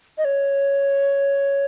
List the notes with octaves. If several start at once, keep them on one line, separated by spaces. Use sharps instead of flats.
D#5
C#5